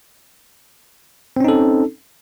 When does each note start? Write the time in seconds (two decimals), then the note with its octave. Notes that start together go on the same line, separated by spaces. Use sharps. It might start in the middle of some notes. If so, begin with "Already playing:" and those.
1.36 C4
1.40 C#4
1.44 D#4
1.48 A4